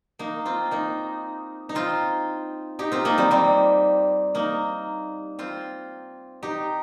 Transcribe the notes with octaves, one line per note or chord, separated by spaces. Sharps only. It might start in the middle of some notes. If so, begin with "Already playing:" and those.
A#3 D#4
C4 F4
A#3 D#4
D#4
C4 F4
D#4 G4
C4 F4
A#3 D#4
G3 C4
G3 C4
A#3 D#4
C4 F4
D#4 G4